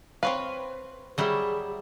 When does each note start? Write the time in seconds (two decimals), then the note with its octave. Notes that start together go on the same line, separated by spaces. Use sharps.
0.23 C4 B4 C#5 F5
1.18 F#3 G3 E4 G#4